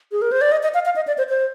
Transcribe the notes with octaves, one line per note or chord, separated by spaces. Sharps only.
G#4
A#4
C5
D5
D#5
D#5
F5
F5
D#5
D5
C5
C5